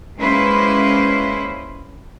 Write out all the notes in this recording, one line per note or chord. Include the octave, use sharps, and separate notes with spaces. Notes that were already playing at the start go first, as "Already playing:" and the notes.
G#3 A#3 C#4 E4 B4 C5